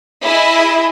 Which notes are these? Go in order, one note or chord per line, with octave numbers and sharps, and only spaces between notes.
E4 G#4 D#5 E5